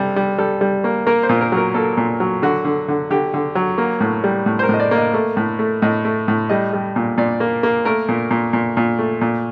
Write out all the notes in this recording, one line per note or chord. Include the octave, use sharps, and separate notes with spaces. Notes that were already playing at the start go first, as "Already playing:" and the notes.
Already playing: C3 G3 A4
G3
G3 A4
G3
A#3
A#3 A#4
C5
A#2
A#4
F#3 A#4
A#3 A4
A#2
F#3
D3 F#4
D3
D3
D3 G4
D3
F#3
A#3
A2
G3
A2
C5
A#4
A2 D#5
D5
A#3
D#5
A3
A2
A3
A2 D#5
A3
A2
G3 D#5
G3
A#2
A#2 D5
A#3
A#3
A3 A#4
A#2
A#2
A#2
A#2
A3
A#2